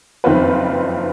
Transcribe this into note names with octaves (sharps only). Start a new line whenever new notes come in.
F#1 F2 D#3 C4 F4 B4